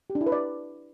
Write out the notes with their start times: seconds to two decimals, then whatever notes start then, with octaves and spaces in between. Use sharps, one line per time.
0.10 G4
0.15 D4
0.21 E4
0.26 B4
0.32 D5